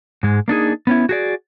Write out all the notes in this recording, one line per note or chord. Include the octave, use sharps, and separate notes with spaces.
G#2 G#3
A#3 D4 D#4 G#4
B3 C#4 E4
F#4 G#4 D5